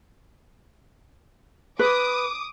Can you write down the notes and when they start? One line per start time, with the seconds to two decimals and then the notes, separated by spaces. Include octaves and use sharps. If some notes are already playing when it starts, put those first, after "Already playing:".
1.79 B4 D6 D#6